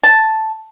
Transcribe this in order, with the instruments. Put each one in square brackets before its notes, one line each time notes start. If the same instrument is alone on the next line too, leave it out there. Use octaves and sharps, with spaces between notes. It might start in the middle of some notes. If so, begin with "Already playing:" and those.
[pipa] A5